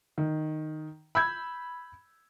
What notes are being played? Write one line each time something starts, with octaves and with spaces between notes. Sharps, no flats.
D#3
B5 E6 G6 G#6